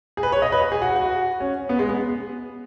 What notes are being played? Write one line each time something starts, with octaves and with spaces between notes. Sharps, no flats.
G#4
B4
C#5
D#5
B4
G#4
F#4
F#4
C#4
B3
G#3
B3